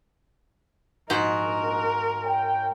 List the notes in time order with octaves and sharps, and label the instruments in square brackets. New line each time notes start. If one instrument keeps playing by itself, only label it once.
[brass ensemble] A#1 D#5 [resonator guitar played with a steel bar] G#2 F#4 [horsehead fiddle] A#4
[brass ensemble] C#5 G5